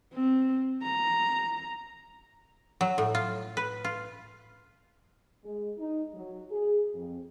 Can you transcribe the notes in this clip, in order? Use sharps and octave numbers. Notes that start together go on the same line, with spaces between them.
C4
A#5
F#3
A2
F4
B4
F4
G#3
D#4
F#3
G#4
F2